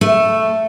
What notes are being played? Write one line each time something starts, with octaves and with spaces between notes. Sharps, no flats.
A3